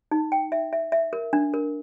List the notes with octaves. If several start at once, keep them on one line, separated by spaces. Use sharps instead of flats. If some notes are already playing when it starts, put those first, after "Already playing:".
D#4
G5
E5
E5
E5
A#4
D4
A#4